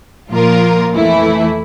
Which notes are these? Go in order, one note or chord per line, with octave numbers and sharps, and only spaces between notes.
A#2 F3 A#3 F4 A#4
F2 E3 A3 E4